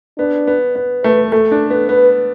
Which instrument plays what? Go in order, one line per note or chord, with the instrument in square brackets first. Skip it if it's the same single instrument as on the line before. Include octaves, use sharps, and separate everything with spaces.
[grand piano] B3 [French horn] D4
[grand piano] B3
B3
[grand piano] A3 [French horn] B4
[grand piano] A3 [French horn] A4
[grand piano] D4
B3
[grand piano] B3 [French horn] B4